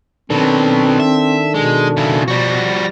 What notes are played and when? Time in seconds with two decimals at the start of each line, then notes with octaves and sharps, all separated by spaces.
0.30 B2 D#3 F#3 C4 D4 A4
1.00 E5
1.55 B2 G#3
1.97 C#3 E4
2.28 F3 G3 F#4 A#6